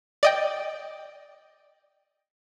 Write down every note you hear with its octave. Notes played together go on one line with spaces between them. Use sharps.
D5 D#5 G5